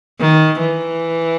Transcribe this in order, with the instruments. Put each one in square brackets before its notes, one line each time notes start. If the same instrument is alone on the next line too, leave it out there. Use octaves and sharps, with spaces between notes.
[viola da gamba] D#3
E3